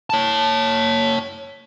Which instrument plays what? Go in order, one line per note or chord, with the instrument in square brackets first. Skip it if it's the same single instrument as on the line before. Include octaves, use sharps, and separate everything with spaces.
[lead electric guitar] C#5 A5